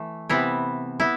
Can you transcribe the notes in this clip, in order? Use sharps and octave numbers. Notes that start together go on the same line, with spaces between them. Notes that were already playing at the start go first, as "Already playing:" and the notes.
Already playing: E3 A3
C3 E3 B3 E4
B3 E4